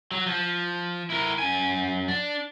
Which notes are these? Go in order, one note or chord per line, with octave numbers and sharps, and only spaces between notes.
F#3
F3
E4 A#4
F#2 G#5
D4